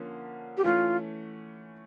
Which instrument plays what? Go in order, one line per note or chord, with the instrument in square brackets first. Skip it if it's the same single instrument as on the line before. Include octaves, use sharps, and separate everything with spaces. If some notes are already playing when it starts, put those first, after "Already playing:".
Already playing: [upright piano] D3 F3 A#3 C#4
[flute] G4
[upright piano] E3 A3 C#4 [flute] F4